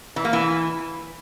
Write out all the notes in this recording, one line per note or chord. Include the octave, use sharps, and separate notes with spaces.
E3
A#3
E3